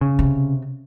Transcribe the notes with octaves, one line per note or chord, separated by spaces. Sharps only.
C#3
C3